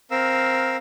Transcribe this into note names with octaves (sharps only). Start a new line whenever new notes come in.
C4 A#4 F5 E6